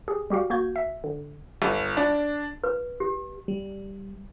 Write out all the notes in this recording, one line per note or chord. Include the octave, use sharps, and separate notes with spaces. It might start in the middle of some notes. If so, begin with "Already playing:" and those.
G4 G#4
G3 F#4 G4 F5
A#3 F#4 G6 G#6
E5
D3
G1
D4
B4
G4
G3